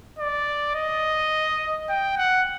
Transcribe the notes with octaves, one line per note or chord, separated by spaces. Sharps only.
D5
D#5
G5
F#5